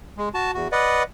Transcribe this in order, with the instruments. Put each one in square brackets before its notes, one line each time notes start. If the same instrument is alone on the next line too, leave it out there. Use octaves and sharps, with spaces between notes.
[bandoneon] G#3
F#4 A5
E2 F#4
B4 D5 D#5 F#5